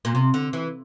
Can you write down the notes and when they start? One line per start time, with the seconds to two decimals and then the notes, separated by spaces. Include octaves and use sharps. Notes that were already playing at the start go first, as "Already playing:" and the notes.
0.05 A#2
0.15 C3
0.34 D3
0.53 E3